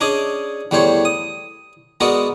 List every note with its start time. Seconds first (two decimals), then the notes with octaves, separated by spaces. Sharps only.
0.01 C#4 D4 G#4 D5 D#5
0.71 E2 G3 A3 C5 C#5
1.05 D#6
2.00 G#3 B3 F#4 A#4 D5 D#5